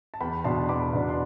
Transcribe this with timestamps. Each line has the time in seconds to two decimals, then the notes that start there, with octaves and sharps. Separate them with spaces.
0.14 A5
0.21 E2 G5 B5
0.44 B2 B3 D4 A5 C6
0.69 E2 B5 D6
0.93 B2 B3 D4
1.09 C6